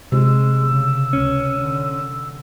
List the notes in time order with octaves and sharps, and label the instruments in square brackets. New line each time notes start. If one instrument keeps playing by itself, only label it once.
[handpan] C3 [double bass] G#3 [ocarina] E6
[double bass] C#3
[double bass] C#2 [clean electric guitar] C#4
[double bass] D3